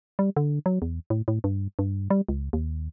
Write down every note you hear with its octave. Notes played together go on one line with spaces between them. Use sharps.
G3
D3
F#3
E2
A2
A2
G2
G2
G3
C#2
D#2